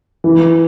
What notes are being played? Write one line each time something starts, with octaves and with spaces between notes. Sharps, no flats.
E3